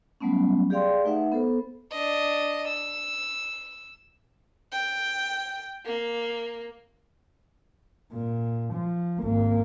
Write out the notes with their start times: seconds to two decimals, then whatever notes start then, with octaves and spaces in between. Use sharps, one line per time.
0.20 F#3 G3 A3 B3 C#4
0.70 G4 G#4 D5 F5 G5 C6
1.05 A3 D#4 B4 E5 F#5
1.32 B3 A4 C5
1.91 D4 D#5
2.68 E6
4.72 G5
5.86 A#3
8.13 A#2
8.75 F3
9.20 G#1 A#3